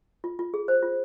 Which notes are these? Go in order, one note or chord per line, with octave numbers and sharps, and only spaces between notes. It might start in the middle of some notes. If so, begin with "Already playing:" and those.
F4
F4
G#4
C5
F4